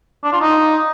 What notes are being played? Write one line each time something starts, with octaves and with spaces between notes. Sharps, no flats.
D4
F4
D#4